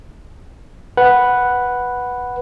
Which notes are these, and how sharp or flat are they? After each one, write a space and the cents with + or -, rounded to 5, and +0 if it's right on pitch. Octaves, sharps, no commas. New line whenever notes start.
B4 +0 F#5 +0